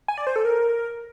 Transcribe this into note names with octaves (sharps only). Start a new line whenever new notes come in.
G#5
D5
C5
A4
A#4